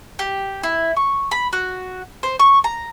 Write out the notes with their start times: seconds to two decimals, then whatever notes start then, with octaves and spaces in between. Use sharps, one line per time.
0.19 G4
0.63 E4
0.97 C#6
1.31 B5
1.53 F#4
2.23 C5
2.40 C#6
2.64 A#5